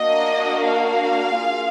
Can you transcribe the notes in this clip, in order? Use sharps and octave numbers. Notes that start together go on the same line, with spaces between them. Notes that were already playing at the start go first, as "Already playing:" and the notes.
Already playing: A#3 D4 F#4 D#5
F5
A#3 F4 G#4